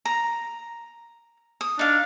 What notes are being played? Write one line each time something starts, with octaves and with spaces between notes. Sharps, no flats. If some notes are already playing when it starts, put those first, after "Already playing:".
A#5
D#6
D4 D#4 F5